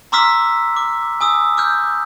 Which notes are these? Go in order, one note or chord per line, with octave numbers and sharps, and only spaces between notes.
A#5 C6 D6 E6 F6 B6
D6
G#5 D#6 E6
D6 F6 G6